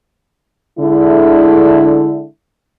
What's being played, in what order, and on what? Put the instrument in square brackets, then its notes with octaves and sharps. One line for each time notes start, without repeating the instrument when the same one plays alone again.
[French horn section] D3 G#3 E4